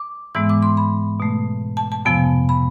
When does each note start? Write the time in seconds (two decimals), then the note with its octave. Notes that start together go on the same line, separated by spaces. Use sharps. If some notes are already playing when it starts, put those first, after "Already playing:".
Already playing: D6
0.35 G#2 E3 G#3 B3 E6
0.49 D6
0.63 C6
0.77 B5
1.20 B2 A3
1.77 A5
1.92 A5
2.05 F2 C3 F3 B3 G#5
2.49 B5